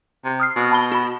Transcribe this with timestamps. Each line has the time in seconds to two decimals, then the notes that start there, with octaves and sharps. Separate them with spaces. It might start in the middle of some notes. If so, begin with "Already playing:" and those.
0.24 C3
0.40 D#6 F6 C7
0.56 B2
0.71 A5 B5 G7
0.92 F#4 B5